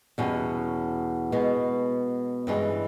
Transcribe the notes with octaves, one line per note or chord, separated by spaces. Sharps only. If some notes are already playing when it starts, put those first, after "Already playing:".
E2 B2 G3 C#4
B2 G#3 B3
G2 E3 G#3 C#4